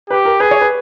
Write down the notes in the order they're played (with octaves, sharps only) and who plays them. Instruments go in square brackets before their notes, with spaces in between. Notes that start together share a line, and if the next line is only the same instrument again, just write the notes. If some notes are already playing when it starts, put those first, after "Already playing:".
[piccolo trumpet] G4 [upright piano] B4
[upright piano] A#4
[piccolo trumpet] G#4 [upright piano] B4
[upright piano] C#5
B4